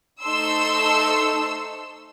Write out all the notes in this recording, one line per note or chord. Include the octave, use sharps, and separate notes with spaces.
A3 D#4 A4 C5 C6 E6